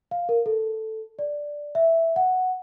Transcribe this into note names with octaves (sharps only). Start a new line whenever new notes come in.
F5
A#4
A4
D5
E5
F#5